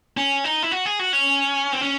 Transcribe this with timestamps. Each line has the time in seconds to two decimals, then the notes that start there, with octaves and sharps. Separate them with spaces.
0.17 C#4
0.44 D#4
0.63 E4
0.71 F#4
0.86 G#4
0.99 F#4
1.13 C#4
1.73 C4
1.81 C#4